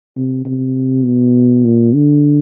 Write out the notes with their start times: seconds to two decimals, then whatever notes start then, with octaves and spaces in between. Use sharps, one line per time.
0.16 C3
0.45 C3
1.05 B2
1.64 A#2
1.94 D3